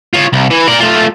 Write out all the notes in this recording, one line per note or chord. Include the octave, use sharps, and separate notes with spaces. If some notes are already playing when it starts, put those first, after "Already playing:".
F4 C#5
C2
E3
A#4 D5
A3 F4